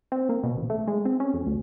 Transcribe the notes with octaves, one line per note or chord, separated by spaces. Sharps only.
C4
A#3
B2
A1
A3
G#3
C4
C#4
F2
D2